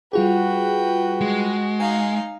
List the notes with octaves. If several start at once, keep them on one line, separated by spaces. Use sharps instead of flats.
G3 F4 F#4 G#4 B4 G5
G#3
D#4 F5 G#5